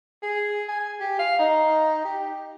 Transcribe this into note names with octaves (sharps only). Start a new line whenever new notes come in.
G#4
G#5
G4
F5
D#4
G4